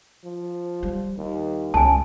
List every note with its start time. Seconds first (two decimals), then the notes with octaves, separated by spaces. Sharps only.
0.24 F3
0.83 G3
1.17 D#2
1.74 C#2 C#3 G#5 A5